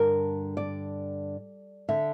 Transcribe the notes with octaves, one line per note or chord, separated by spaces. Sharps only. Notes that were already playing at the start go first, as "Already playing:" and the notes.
Already playing: G2 D3 A#4
D5
D3 E5